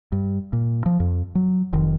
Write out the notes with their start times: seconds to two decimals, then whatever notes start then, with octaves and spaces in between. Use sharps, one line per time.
0.12 G2
0.53 A#2
0.86 F3
1.00 F2
1.35 F#3
1.73 F1 D#3